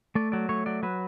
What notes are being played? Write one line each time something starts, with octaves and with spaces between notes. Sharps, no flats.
A3 D5
F#3 D5
A3 C#5
F#3 D5
F#3 B4